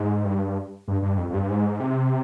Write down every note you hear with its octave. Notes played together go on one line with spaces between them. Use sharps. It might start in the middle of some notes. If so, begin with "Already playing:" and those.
Already playing: G#2
G2
G2
G2
F2
F2
G2
G#2
C3